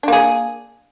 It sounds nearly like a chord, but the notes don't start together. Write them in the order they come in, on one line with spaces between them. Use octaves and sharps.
D4 A#3 G#4